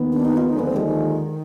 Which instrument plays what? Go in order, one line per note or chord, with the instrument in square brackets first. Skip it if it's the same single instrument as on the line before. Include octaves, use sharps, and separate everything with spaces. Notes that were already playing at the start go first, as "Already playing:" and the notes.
Already playing: [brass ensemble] D#2 D#3 B3
[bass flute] D4
D#4
F4
[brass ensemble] D#2 D3 F3 G#3 [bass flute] D#4
[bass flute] B3
C4
G3
D#3